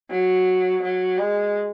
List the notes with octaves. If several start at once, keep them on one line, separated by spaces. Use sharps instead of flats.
F#3
F#3
G#3